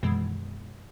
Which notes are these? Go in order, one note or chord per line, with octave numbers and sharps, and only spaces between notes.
F#2 B2 D#3 E3 G#3